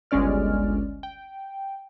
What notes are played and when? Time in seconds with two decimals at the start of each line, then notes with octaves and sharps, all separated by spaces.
0.11 G1 C#2 G#3 C#4 D5 F6
1.03 G5